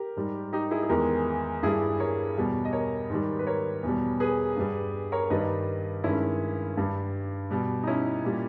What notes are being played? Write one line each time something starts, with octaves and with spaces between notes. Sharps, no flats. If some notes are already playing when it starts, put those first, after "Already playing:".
Already playing: G4 A#4
G#2 G3
D#4 G4
E4 G#4
G#4
E2 D#3 G#3 G4 A#4
G2 G3 E4 G#4
A#4 C#5
E2 B2 G3
D#5
A#4 C#5
G#2 D#3 G3
B4
A#4 C#5
E2 B2 G3
G#4 B4
G2 G3
A#4 C#5
G2 D#3 G3 B4 D#5
G2 D#3 G#3 C#4 E4
G2 G3
B2 G3
D#4
C#4 E4
A#2 G3